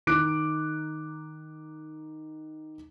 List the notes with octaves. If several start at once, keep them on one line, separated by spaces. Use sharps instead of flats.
D#3 D#4 D6 F#6 D7